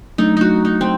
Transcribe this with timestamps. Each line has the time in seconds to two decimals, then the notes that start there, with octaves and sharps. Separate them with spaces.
0.18 F#3 A3 D4 D#4
0.37 D#4 F#4
0.65 D#4
0.81 C4